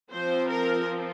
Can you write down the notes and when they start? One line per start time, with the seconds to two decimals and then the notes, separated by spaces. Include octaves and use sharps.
0.11 F3 C4 C5
0.49 A#4